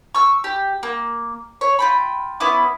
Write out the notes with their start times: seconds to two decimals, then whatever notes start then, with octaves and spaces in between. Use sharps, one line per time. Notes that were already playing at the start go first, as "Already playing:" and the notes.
0.15 C#6 E6
0.44 G4
0.83 A#3
1.61 C#5
1.79 F4 G5 B5
2.40 B3 C#4 E4 D6